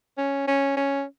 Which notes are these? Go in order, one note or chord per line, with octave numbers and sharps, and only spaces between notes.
C#4
C#4
C#4